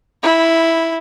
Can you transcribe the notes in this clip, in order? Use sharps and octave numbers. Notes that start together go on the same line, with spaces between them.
E4